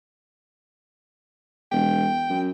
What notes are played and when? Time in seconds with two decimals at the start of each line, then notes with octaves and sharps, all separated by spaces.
1.72 E1 G5
2.30 F#2